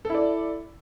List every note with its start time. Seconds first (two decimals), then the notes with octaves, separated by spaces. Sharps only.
0.05 A4
0.10 E4
0.14 D5